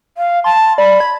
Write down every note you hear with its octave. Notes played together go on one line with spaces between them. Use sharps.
F5
A5 C6
D5 B5
G#6